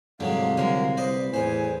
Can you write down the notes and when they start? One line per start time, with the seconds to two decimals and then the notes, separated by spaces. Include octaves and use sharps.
0.20 C2 G#2 D3 F#3 G#3 G4 F5
0.57 D3 F#3 G#3 A#4
0.97 B4 C5 D5 D#5
1.34 E2 A2 C5 G#5